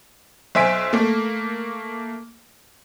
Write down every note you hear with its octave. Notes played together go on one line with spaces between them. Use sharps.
B1 C5 E5 G#5 B6 D7
A3 A#3